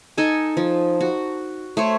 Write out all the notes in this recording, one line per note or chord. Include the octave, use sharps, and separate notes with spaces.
D#4 A4 D#5 G#5
F3
F#4
A3 C5 C#5